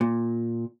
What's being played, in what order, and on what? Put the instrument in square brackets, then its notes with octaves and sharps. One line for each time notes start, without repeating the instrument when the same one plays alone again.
[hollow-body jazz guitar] A#2